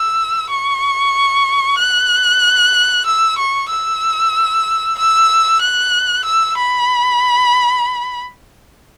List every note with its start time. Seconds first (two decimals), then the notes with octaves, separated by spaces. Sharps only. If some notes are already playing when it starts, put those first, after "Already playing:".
Already playing: E6
0.50 C#6
1.78 F#6
3.06 E6
3.38 C#6
3.70 E6
4.98 E6
5.62 F#6
6.25 E6
6.58 B5